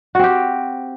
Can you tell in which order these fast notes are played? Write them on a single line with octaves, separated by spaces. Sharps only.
F#4 C4 G4